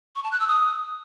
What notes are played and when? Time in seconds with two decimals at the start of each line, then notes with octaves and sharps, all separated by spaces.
0.16 C#6
0.24 A5
0.32 F#6
0.40 E6
0.48 D#6